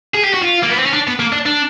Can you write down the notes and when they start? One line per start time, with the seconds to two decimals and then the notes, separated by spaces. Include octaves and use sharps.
0.15 G#4
0.24 G4
0.34 F#4
0.43 F4
0.63 A#3
0.70 B3
0.79 C4
0.86 C#4
0.94 D4
1.08 B3
1.20 A#3
1.32 D4
1.46 D4